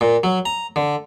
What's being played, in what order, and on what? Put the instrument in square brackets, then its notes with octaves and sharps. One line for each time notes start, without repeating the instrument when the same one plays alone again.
[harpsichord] A#2
F#3
A#5
D3